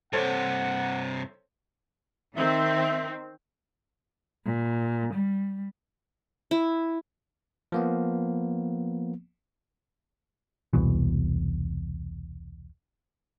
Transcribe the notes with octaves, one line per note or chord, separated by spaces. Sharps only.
G2 C3 A4 C5 C#5 F#5
D#3 C4 E5
A#2
G3
E4
F3 A#3 B3
E1 C2 B2 E3